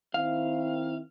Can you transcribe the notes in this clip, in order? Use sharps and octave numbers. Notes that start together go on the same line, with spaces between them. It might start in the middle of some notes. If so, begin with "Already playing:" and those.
D#3 C4 E4 F5